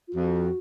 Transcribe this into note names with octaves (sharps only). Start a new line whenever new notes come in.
F4
F2 F#4